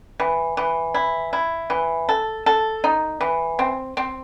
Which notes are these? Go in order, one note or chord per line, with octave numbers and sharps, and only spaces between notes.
E3
E3
E4
E4
E3
A4
A4
D#4
E3
C4
C4